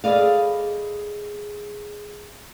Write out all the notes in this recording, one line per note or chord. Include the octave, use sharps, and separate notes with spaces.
G#4 A4 B4 D5 D#5 F5